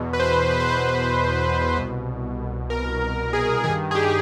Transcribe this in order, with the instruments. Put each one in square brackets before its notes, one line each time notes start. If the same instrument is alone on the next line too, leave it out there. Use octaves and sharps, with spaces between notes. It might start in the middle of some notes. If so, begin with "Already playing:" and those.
Already playing: [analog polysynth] E2 B2
B4
C5
B4
C5
B4
C2 B2
A#4
G#4
G2 D#3 G#4
G#4
G4